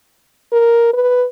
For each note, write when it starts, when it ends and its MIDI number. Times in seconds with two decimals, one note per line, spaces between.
0.52 0.93 70
0.93 1.26 71